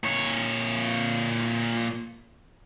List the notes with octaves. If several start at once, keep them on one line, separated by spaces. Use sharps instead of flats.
A#2 C#5